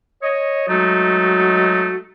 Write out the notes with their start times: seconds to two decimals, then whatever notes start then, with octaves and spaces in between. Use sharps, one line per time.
0.22 C#5 D#5
0.69 F#3 G#3 A3 D#4 F#4